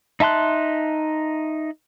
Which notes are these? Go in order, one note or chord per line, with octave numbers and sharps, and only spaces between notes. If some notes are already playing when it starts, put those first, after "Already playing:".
D#4 E5 A5 C6 F#6